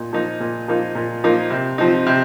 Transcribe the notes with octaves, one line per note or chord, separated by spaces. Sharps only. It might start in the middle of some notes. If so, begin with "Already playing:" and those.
Already playing: A#2 D#4
F3 A#3 D#4
A#2
F3 A#3 D#4
A#2
F3 A#3 D#4
C3
F3 C4 D#4
C3